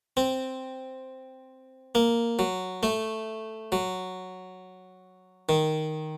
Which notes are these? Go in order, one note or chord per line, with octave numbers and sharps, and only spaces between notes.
C4
A#3
F#3
A3
F#3
D#3